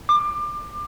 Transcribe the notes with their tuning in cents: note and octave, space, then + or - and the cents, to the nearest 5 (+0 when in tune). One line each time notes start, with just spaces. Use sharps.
D6 +25